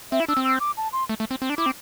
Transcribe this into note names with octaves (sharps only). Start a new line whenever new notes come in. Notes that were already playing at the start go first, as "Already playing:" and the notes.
C4 E5
E4
D4 E6
C4
E6
D6
A5
C6
A3
A3
C4
C4
D4
E4 D6
C4